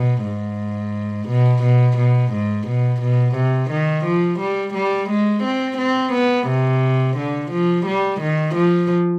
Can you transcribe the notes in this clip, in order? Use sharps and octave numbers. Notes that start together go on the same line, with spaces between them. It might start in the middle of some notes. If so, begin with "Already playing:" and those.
Already playing: B2
G#2
B2
B2
B2
G#2
B2
B2
C3
D#3
F3
G3
G3
G#3
C4
C4
B3
C3
D3
F3
G3
D#3
F3